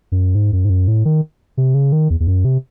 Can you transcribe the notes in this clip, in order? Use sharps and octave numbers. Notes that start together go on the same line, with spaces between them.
F#2
G#2
F#2
G#2
F#2
A2
D#3
C3
C#3
D#3
E2
E2
F#2
C3